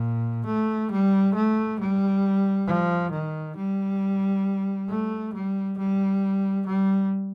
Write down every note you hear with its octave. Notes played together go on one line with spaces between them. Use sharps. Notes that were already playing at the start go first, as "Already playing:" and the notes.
Already playing: A#2
A3
G3
A3
G3
F3
D#3
G3
A3
G3
G3
G3